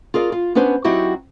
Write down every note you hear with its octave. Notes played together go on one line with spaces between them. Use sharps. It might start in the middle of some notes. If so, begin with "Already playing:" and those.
F4 G#4 A#4 D5
F4
B3 C#4 D4 B4 C5
F#3 C4 D#4 E4 F#4 G4